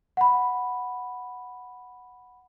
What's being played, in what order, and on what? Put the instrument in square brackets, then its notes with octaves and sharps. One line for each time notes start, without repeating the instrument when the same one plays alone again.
[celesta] F#5 B5